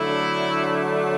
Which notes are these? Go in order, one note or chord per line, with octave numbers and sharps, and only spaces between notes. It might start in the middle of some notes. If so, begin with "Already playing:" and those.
Already playing: D3 F#3 A3 D4 E4